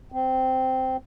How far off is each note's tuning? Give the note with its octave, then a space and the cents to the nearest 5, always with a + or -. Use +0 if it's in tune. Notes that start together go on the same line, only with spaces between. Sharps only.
C4 -10